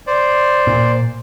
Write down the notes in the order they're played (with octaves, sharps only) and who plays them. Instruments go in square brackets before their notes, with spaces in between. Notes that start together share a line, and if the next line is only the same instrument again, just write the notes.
[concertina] C5 D5
[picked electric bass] A#2